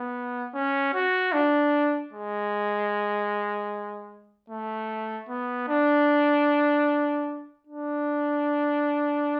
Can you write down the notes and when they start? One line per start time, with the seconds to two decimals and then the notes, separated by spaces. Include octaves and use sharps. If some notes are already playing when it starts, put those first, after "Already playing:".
Already playing: B3
0.54 C#4
0.94 F#4
1.33 D4
2.13 G#3
4.50 A3
5.29 B3
5.68 D4
7.67 D4